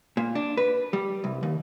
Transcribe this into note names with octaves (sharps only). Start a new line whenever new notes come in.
A#2
D4
B4
G3
C2
D#2